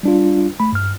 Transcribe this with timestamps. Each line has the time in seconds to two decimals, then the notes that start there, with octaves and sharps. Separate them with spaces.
0.03 G3 D4 F4
0.60 A3 B5
0.73 G2 F6